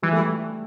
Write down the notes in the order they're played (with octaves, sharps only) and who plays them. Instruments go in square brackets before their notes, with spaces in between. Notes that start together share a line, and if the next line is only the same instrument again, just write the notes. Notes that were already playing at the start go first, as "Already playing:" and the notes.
[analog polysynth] E3 [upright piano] G3
[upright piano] A3
G3